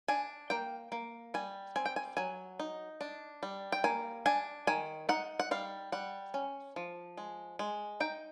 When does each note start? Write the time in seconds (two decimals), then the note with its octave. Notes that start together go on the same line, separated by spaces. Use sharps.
0.08 D4 G#5
0.50 A#3 G5
0.92 A#3
1.34 G3 G#5
1.76 C4 G#5
1.85 G5
1.96 G#5
2.17 F#3 G#5
2.60 D#4
3.01 D4
3.43 G3
3.72 G5
3.84 A#3 G#5
4.26 D4 G#5
4.67 D#3 G#5
5.09 D#4 F#5
5.39 F#5
5.51 G3 F5
5.92 G3 F#5
6.34 C#4
6.76 F3
7.17 G#3
7.59 G#3
8.00 D#4 G5